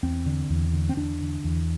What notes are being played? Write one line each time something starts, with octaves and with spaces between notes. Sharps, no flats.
E2 C4
D3
E2
D3
C4
E2 D4
D3
E2